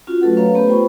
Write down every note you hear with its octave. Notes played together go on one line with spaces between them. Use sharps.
C#4 F4 F#4
F#3 A3 F#4 A4 B4 F#5
C#4 B4 C#5 F5 A#5
A3 B3 G4 B4 C5
F4 A4 C5 G5 B5 C#6